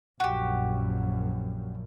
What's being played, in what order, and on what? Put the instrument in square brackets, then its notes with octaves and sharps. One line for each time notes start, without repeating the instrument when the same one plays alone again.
[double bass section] A#1 F#2 [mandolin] F#4 G4